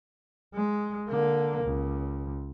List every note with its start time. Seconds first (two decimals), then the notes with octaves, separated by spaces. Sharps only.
0.54 G#3
1.08 D3 A#3
1.64 C#2